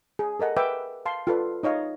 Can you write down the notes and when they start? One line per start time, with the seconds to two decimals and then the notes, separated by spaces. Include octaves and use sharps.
0.19 G#4
0.40 A4 A#4 D#5 F#5
0.57 B4 E5 G5 D6
1.06 F5 A5 C6
1.27 F4 A4 B4 D5
1.63 D#4 C#5 D#5 F5